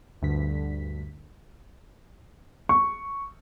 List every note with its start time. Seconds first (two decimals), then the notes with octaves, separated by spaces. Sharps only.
0.22 D2 G2 D3 B6
2.69 C#6